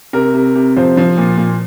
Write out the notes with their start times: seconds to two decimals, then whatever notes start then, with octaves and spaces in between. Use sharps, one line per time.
0.13 C3 A#4
0.34 C3
0.55 C3
0.76 F3 C5
0.97 F3
1.17 A#2
1.37 A#2